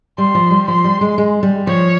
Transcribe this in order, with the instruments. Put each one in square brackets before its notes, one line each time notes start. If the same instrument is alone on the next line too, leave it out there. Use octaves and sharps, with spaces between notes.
[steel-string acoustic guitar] G3 [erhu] C6
[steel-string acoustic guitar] F3
G3
[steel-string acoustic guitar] F3 [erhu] C6
[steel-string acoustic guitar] G3
G#3
G#3
G3
[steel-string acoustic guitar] F3 [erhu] C#5